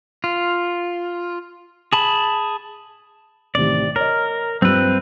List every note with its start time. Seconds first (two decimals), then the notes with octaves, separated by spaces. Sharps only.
0.24 F4
1.93 G#4 A5 B5
3.55 A1 C3 D#3 D5
3.96 A#4 C#5 D#5
4.62 G2 F3 C4 B4 E6